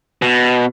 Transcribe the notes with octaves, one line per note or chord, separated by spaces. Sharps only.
B2